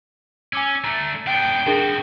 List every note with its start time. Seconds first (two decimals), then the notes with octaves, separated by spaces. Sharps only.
0.53 C#4 G#5 D6 E6
0.84 A3 D4 A#5 A6
1.27 B3 D4 G5 D7
1.67 C4 D4 F#4 G#4 A#4